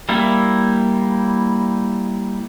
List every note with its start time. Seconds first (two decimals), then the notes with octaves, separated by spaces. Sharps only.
0.09 G3 A#3 E4